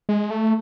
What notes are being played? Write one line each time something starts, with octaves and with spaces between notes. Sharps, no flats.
G#3
A3